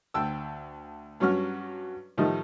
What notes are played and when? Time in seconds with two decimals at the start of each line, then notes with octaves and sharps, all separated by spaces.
0.14 D2 G5 A5 E6
1.20 G2 F#3 G3 C#4 F#4 F6
2.18 A2 D#3 F3 G3 A3 D#4